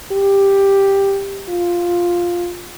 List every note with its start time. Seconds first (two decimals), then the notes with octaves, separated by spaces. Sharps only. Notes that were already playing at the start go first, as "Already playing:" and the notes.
0.12 G4
1.49 F4